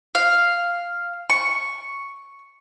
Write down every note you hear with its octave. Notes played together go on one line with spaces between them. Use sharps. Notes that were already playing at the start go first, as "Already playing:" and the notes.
F5
C#6